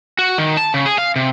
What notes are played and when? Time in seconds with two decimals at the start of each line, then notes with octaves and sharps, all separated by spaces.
0.19 F#4
0.38 D#3
0.57 A5
0.74 C#3
0.86 G#4
0.98 F5
1.16 C3